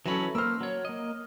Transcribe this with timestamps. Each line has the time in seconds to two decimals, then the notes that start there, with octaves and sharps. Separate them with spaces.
0.06 E3 F#3 C#4 A4 B5
0.35 A#3 C5 E6 F6
0.60 F#3 C#5
0.85 A#3 D#5